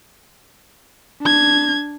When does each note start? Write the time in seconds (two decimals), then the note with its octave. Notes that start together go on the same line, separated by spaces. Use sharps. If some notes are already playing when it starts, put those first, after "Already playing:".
1.22 D4 G#6